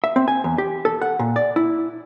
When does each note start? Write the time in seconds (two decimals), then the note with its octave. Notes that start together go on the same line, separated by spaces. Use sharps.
0.04 E5
0.16 C4
0.28 G#5
0.44 E2
0.58 G4
0.85 A4
1.02 F#5
1.19 A#2
1.36 D5
1.56 E4